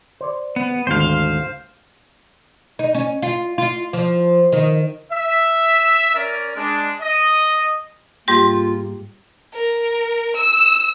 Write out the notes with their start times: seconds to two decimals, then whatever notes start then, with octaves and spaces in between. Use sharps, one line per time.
0.21 C5 D5
0.56 B3
0.87 G#1 D2 C5 F5
2.79 D#4
2.95 C#4
3.22 F4
3.58 F4
3.93 F3
4.52 D#3
5.12 E5
6.15 C#4 A#4 D5
6.55 G#3 D4
7.01 D#5
8.28 G#2 G3 A#3 F4 G4
9.54 A#4
10.35 E6